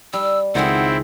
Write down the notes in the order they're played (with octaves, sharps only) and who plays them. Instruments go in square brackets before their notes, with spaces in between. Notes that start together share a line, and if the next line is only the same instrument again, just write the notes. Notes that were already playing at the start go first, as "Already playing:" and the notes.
[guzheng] G3 [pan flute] E6
[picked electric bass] C#2 [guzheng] D#3 G#3 [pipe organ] C4 E4 [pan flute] F#5